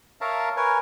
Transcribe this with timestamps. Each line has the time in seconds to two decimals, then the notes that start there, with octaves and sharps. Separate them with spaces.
0.21 A#4 C#5 E5 F5 A5 A#5
0.56 A#4 B4 C#5 G#5